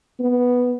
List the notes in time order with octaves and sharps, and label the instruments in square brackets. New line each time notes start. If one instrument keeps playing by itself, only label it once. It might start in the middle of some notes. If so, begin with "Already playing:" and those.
[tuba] B3